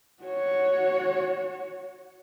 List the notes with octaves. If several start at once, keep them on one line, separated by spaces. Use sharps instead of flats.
F#4 C#5